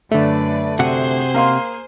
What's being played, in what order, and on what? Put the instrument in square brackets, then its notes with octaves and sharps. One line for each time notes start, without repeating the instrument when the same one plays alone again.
[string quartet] F#2 B4 D5 [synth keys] D3 A3
[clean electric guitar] C3 F#4 F#5 [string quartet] G#4 C5
[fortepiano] A#3 F5 C6